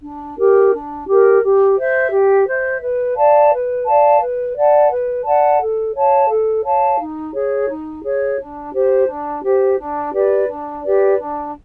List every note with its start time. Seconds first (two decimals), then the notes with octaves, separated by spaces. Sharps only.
0.02 D4
0.37 G4 A#4
0.73 D4
1.07 G4 A#4
1.41 G4
1.76 C5 E5
2.11 G4
2.46 C5 E5
2.81 B4
3.16 D5 F5 A5
3.51 B4
3.85 D5 F5 A5
4.21 B4
4.55 D5 F#5 A5
4.90 B4
5.25 D5 F#5 A5
5.60 A4
5.94 C#5 F5 A5
6.29 A4
6.64 C#5 F5 A5
6.99 D#4
7.33 G#4 C#5
7.68 D#4
8.03 G#4 C#5
8.39 D4
8.73 G4 C5
9.07 D4
9.42 G4 C5
9.78 D4
10.12 G4 B4 D5
10.47 D4
10.81 G4 B4 D5
11.16 D4